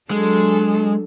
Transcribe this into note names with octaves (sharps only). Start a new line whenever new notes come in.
F#3 G#3 D4 A4